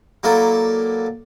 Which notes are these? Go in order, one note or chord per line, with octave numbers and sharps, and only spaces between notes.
F#3 A#3 E4 A4 D5